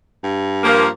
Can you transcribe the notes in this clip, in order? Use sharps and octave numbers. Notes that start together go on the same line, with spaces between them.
G2
F3 A#3